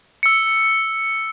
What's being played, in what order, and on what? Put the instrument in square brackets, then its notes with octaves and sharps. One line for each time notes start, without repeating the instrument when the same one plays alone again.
[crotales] E6 C#7